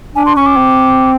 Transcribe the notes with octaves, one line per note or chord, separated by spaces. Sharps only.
D4 G#5
C6
C#4 C#6
D6
C4